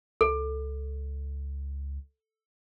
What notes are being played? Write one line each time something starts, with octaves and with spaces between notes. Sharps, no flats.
C#2 A4